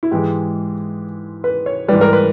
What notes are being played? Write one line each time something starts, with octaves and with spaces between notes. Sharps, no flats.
E4
G#2 E3 G#3 G4
B4
C#5
G#2 E3 G3 B4
A#4
B4